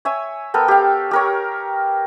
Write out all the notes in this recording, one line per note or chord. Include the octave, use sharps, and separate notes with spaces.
C#5 E5 G#5
B3 A4 A#4 G5
G4 F5
G4 A#4 C#5